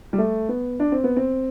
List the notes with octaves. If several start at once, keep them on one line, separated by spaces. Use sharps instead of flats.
G3
A3
B3
D4
C4
B3
C4